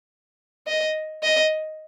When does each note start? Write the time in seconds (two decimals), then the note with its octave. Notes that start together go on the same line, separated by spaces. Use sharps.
0.67 D#5
1.23 D#5